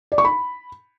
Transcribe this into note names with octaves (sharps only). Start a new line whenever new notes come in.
D5
C#6
B5